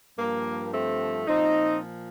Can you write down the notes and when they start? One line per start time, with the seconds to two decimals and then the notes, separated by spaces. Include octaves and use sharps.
0.17 G2 F3 A#3
0.72 A3 C4
1.27 A#2 F3 C4 D#4